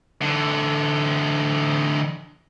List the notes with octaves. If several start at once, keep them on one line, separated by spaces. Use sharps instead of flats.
D3 E3